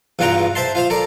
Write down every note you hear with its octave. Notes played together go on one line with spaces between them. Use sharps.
E2 G2 F4 F#4 G5 A#5
C5 E5 A5 C6
F4 C5 F5
A4 A#4 D5